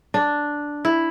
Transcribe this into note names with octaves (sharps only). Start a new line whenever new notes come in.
D4
E4